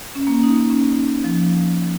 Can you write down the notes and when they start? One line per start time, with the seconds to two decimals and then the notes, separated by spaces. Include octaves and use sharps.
0.15 C#4
0.27 A#3
0.35 C#4
0.43 D#4
0.70 C#4
1.24 F3